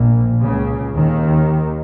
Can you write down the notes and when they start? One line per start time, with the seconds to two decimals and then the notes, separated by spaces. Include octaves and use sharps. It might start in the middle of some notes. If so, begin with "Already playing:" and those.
Already playing: A#1 A#2
0.41 C#2 C#3
0.94 D#2 D#3